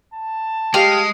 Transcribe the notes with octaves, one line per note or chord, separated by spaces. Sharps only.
A5
G#3 G4 F5